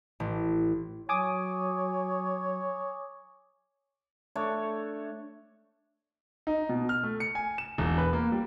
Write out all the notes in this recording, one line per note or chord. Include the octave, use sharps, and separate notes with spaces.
A1
F#3 C#5 G#5 D6 D#6
A3 D4 C#5
D#4
B2
F6
A3
C#7
G#5
E7
E1
B4
A#3
G3